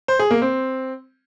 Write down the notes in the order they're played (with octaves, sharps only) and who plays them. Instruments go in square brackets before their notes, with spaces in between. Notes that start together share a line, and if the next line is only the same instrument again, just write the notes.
[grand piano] C5
G#4
A#3
C4